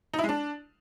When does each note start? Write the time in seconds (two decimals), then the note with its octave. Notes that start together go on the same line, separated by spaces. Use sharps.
0.13 D#4
0.19 E4
0.24 G#3
0.29 D4